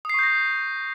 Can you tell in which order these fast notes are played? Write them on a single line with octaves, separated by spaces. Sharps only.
D#6 C7 C#6 G6 A#6